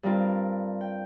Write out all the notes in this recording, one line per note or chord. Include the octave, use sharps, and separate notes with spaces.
G2 G3 C4 F4 A#4
G5